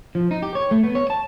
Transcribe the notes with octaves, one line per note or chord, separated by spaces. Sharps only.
F3
D#4
G4
C#5
A3
B3
C#5
A5